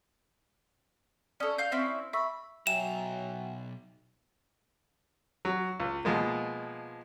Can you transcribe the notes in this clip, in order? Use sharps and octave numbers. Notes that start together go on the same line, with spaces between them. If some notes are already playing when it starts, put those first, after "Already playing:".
C#4 A4 D5 D#6
F5 G6
C4 C#4 E4
E5 B5 C#6 E6
B1 F#3 E5 G5 G#5 A#5 E7
F#3
C#2
B2 F3 G#3 A#3